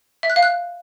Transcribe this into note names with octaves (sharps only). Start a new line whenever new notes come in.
E5
F#6
F5
F#6